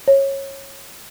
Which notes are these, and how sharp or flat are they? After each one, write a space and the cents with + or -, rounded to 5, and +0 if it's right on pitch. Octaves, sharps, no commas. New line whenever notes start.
C#5 -20